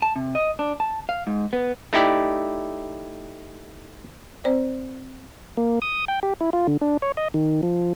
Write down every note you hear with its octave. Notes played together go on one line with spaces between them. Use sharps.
A5
C3
D#5
D4
A5
F5
G#2
B3
A3 D#4 E4 G4 D5
C4 C5 D5
A#3
D#6
G5
G4
E4
F4
D3
D4
C#5
D#5
D#3
F3